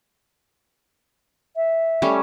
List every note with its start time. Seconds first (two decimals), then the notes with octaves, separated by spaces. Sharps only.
1.56 E5
2.02 G3 A3 C#4